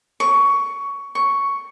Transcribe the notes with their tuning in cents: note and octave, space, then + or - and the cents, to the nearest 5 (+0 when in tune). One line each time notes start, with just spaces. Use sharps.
C#6 +15
C#6 +5